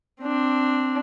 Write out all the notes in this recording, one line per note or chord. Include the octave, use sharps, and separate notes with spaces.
C4 D4